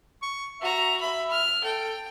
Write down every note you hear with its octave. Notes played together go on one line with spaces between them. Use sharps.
C#6
F#4 E5 A#5
E5 B5
F6
A4 G5